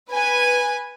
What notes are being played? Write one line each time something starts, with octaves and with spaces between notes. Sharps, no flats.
B4 G#5